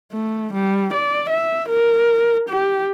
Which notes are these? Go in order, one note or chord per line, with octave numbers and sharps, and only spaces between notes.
A3
G3
D5
E5
A#4
G4